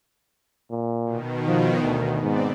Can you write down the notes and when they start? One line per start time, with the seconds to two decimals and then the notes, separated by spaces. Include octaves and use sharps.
0.71 A#2
1.04 B2 D#3
1.48 F3
1.82 D2
2.23 G#2 B3 C4 D5